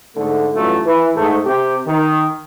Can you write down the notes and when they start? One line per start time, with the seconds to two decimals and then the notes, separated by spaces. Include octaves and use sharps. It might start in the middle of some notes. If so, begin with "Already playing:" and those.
0.16 G#2 D3 A3
0.54 A1 G2 F#3 A3 F4
0.85 E3
1.15 G#2 A3
1.45 C3 G4
1.86 D#3